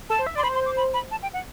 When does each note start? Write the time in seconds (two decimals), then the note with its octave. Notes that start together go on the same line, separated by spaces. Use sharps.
0.10 A4 A5
0.18 C5
0.27 E5
0.35 D5 C6
0.43 C5 B5
0.55 C6
0.66 D6
0.77 B5
0.94 B5
1.11 A5
1.22 G5
1.33 F#5